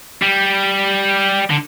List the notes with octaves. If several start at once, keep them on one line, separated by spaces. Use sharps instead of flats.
G3
D3